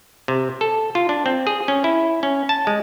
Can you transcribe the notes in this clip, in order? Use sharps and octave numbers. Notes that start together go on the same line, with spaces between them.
C3
A4
F4
D4
C4
G#4
C#4
E4
C#4
A5
G#3